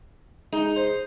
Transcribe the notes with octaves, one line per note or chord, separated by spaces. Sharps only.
G#3 D#4
C5